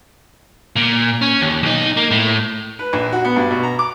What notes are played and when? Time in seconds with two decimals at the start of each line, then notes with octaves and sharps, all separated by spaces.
0.76 A#2
1.22 C#4
1.42 D#2
1.63 B1 D#4
1.97 A#3
2.11 A2
2.79 B4
2.93 A#1
3.12 F#4
3.25 B3
3.36 G2
3.51 B2
3.63 A#5
3.79 D6